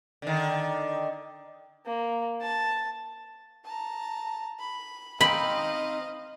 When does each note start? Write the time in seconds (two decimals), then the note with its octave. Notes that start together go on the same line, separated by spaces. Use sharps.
0.22 D3 D#3
1.86 A#3
2.42 A5
3.65 A5 A#5
4.59 B5
5.21 C4 D#4 D#5 F5 B5